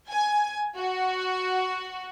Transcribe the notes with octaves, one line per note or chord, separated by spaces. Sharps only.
G#5
F#4